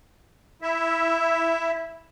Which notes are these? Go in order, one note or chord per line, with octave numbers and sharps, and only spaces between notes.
E4 E5